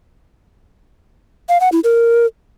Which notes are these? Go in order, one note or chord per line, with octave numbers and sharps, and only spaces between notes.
F5
F#5
E4
A#4